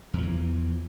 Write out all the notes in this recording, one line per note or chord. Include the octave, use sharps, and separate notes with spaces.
E2 E3 F3